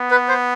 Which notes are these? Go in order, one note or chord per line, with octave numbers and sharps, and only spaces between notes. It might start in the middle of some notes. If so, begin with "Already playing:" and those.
Already playing: B3
B4
C5